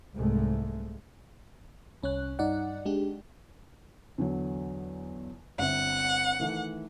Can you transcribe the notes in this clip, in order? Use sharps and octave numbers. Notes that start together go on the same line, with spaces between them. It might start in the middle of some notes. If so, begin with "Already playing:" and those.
C2 G#2 G#3 A3
C2 C#4 C#5 F#6
G2 D#4 D5 F#5
G#3 D4 G4
E2 D3 F#3
G1 C4 E5 F#5
D#3 E3 A3